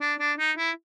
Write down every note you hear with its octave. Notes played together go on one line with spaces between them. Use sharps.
D4
D4
D#4
E4